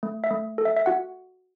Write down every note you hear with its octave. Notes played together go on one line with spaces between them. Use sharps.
A3
E5
A3
A4
E5
E5
F#4 F#5